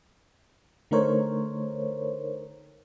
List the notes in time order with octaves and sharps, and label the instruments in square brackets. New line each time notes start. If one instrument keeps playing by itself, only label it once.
[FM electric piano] D3 A3 D#4 A#4 C5 C#5